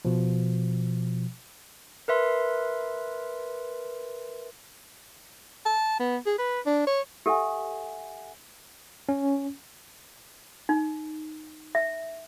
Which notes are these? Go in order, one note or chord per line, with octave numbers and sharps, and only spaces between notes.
B2 F3
A#4 B4 E5 C6
A5
B3
G#4
B4
D4
C#5
G4 A4 E5 F#5 G#5
C#4
D#4
E5